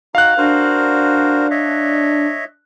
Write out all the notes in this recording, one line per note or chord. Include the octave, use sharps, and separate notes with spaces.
D#4 F#4 F5 F#6
D4 F#4 A#4 C5
C#5 D#5 E5